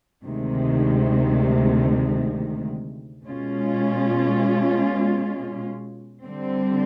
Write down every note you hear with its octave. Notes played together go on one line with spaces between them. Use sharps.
D2 C3 D#3 G#3
B2 G#3 C#4 F4
D3 G3 C4